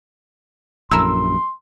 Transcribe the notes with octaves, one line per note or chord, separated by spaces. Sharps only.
A#1 F#2 E4 A4 A#4 C6 E6